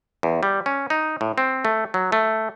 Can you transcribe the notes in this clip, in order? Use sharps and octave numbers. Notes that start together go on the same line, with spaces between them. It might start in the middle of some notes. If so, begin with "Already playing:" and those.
E2
G3
C#4
D#4
A2
C4
A3
F#3
A3